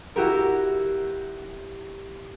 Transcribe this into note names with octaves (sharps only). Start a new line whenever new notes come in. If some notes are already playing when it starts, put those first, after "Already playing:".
E4 F#4 G4 A#4